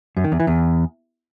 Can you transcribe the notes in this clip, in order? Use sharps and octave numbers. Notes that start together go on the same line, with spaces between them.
F#2
D#3
E2
E3
E2